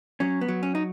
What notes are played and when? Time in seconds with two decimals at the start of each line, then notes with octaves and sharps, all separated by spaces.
0.20 F#3 C#4
0.41 B3
0.48 F#3
0.63 C#4
0.75 D#4